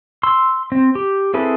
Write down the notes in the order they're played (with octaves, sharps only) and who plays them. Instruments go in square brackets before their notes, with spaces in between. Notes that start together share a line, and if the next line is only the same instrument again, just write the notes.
[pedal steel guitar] C6 E6
C4
G4
C4 E4 G#4 A4 B4